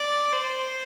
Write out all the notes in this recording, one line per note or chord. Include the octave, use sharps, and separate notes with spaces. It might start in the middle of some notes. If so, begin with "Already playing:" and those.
Already playing: D5
C5